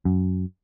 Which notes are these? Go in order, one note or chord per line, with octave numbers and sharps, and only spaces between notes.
F#2